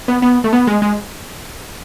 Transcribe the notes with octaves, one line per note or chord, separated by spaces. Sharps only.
B3
B3
A3
B3
G#3
G#3